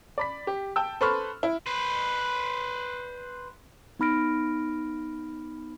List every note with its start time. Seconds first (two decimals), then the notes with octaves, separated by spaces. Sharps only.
0.18 D5 B5 B6
0.47 G4
0.76 G5 A5 E6
1.01 A4 B4 C5 B5 C#6 F6
1.43 E4
1.66 B4 C5
3.99 B3 D#4 B5 F6 A#6 D7